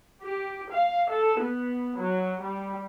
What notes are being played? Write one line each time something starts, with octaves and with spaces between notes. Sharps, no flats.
G4
F5
A4
B3
F#3
G3